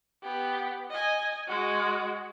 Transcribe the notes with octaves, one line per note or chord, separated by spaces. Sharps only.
B3 G4
D#5 G#5
G#3 F#4